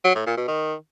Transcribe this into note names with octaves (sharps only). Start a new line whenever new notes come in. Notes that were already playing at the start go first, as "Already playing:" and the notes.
F#3
A2
A#2
B2
D#3